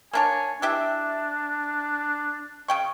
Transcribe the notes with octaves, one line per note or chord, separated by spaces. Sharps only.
A#3 D4 C#5 G#5
D4 E4 G4 E5
C#3 G5 C#6